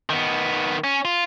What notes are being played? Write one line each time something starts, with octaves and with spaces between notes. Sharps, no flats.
D#3 B3
C#4
F4